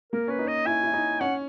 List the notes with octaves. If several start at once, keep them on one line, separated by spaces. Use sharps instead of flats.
A#3 A#4
C#4 B4
D#4
D#5
E4 G#5
E4
D#4
C#4 F#5